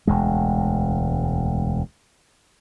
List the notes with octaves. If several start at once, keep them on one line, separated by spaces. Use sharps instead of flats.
E1 D2 G#3